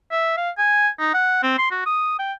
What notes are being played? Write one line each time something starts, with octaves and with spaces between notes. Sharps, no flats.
E5
F5
G#5
D#4
F#5
C4
C6
F#4
D#6
G5